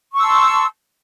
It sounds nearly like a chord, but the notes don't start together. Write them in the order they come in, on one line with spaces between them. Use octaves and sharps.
C#6 E6 C6 A5